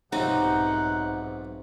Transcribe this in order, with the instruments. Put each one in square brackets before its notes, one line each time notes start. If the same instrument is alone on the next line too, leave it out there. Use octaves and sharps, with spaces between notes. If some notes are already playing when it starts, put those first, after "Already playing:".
[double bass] B1 G#2 [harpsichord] C3 F3 F#3 [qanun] D#4 [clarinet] F#5